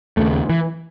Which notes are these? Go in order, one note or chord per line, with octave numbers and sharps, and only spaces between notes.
D#2 C#3 A3
E3